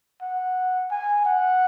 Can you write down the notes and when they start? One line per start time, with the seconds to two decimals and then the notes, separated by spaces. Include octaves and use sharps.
0.22 F#5
0.91 G#5
1.25 F#5